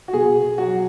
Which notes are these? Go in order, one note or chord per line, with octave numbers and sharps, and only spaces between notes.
F#4
B2 G#4
F#3 F#4